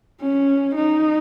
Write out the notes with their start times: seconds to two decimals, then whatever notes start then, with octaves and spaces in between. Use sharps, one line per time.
0.21 C#4
0.75 D#4